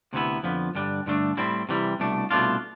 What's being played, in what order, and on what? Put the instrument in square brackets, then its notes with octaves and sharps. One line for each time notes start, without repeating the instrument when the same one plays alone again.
[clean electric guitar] D2 C3 E3 B3 E4
F2 D3 F3 B3
G2 D3 G3 D4
G2 D3 A3 D4
A2 G3 C4 E4
C3 E3 G3
C2 B2 A3 D4
C2 B2 A3 D4 F4